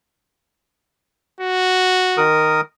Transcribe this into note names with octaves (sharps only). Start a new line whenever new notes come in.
F#4
D#3 A#4 D#6